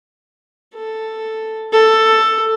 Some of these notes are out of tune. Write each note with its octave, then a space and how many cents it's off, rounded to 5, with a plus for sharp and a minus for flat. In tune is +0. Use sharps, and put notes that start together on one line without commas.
A4 +5
A4 +10